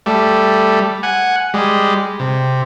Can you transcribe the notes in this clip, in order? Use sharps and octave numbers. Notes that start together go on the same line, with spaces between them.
G3 A3
F#5 G#5
G3 G#3
C3